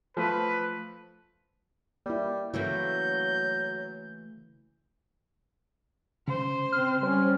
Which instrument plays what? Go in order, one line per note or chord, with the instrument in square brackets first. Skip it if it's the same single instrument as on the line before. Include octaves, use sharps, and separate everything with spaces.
[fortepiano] F3 A3 [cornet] B4
[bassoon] G3 [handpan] A#3 E4
[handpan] C#3 E4 [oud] E3 A3 A#3 [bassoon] F#3 [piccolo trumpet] G6
[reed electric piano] C#3 [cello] C5
[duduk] C4 [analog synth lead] F6
[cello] G3 [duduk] C#4 [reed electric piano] C5